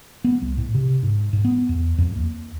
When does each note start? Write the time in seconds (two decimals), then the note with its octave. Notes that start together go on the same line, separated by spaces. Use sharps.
0.24 B3
0.42 C2
0.57 A2
0.75 C3
1.03 G#2
1.33 G#2
1.45 B3
1.69 E2
1.98 F2
2.16 D#2